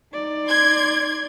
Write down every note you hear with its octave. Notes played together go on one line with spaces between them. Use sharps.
D#4 D5
C6 G#6